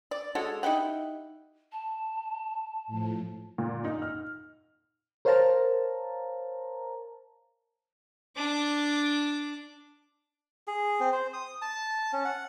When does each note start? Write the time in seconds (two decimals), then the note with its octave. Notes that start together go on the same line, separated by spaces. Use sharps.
0.11 D5
0.35 G#3 F#4 A4 C#5
0.63 D#4 E4 G4 F#5
1.72 A5
2.87 A2 F3
3.58 A#2
3.85 D#4
4.02 F6
5.25 A#4 C5 C#5 F5 A5 A#5
8.36 D4 D6
10.68 G#4
11.00 C4
11.12 C5
11.33 D#6
11.62 A5
12.13 C#4
12.25 F#5